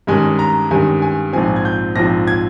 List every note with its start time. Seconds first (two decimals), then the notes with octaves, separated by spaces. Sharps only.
0.07 G2 D#3 G#3 C#4 G#5
0.39 A#5
0.71 G2 D#3 G#3 C#4 G#5
1.02 G#5
1.33 A#1 G#2 F3 C4 G#5
1.56 G#6
1.65 G6
1.96 A#1 G#2 F3 C4 A#6
2.27 G#6